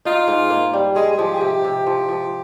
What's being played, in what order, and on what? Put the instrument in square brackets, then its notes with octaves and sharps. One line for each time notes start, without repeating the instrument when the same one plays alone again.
[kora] D#4 [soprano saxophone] F4
[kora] G#2
A#3
G3
[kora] G#3 [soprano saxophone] G#4
[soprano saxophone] G#4
[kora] F3 [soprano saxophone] G4
[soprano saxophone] G#4
[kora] C3 [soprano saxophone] G4
[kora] C3
F3
F3